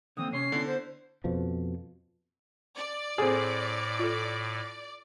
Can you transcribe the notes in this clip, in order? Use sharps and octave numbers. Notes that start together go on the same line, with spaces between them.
D3 E3 A#3 C4 D#6
C3 C#4 C#5 C6 C7
D3 B3 E4
C5
F2 B2 F3
D5
A2 C4 G#4 A4
F4 A4